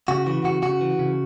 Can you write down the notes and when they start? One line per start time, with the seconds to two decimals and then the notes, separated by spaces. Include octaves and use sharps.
0.08 C#3 F#4
0.26 E3 F#4
0.44 C#3 F#4
0.63 C#3 F#4
0.81 E3
0.99 C#3